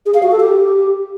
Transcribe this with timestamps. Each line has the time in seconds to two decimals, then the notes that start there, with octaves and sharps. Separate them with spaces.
0.06 G#4
0.14 F5
0.23 F#4
0.31 A4
0.40 G4